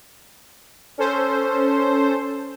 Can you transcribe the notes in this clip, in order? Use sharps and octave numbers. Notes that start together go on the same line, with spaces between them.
C#4 A4 C5